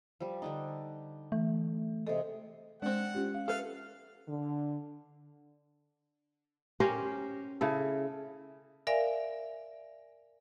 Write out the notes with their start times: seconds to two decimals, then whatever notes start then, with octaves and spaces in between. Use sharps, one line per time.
0.20 F3 G3
0.42 D3 D4 D#4
1.32 E3 A3
2.07 C3 G#3 A4 D#5
2.82 G#3 C4 D4 F#5
3.15 C#4 F4 G4
3.34 F5
3.48 A4 B4 E5 F5
4.28 D3
6.80 C#4 G4 A#4 C5
7.61 C#3 E4 A4
8.87 A#4 D5 E5 F5 G#5